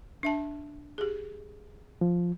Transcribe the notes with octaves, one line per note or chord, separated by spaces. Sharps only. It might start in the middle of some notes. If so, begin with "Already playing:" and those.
D4 E5 A5
G4 G#4
F3